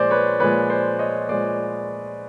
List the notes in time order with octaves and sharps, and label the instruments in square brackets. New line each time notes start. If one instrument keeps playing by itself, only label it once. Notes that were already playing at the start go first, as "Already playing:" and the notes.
Already playing: [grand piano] A#2 F3 G#3 C5 D5
B4 C#5
A#2 F3 G#3 B4 C#5
C5 D5
C#5 D#5
A#2 F3 G#3 C5 D5